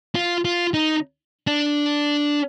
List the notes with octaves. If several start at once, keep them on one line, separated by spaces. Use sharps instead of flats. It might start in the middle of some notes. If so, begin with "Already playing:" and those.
F4
F4
D#4
D4